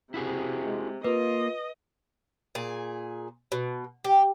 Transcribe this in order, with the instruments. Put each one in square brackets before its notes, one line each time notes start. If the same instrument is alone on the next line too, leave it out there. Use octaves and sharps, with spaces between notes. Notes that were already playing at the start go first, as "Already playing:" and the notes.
[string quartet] C3 [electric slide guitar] E4 F#4 G#4
[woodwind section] G#3
[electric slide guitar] A#3 [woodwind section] F4 [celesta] B4 [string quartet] D#5
[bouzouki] A#2 G#4
B2
G4